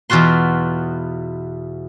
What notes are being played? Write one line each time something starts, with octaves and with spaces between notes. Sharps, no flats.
E2 B2 F4 F#4 C6